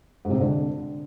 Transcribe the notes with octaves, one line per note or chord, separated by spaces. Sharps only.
G#2
C3
G#2
D3